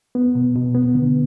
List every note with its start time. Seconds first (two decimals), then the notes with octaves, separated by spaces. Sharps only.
0.15 B3
0.35 B2
0.55 B2
0.75 B3
0.95 D3